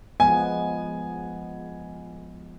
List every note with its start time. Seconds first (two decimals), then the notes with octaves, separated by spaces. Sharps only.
0.20 F3 G#3 B3 G#5